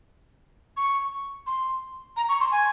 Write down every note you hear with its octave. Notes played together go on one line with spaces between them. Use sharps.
C#6
C6
A#5
C#6
C6
G#5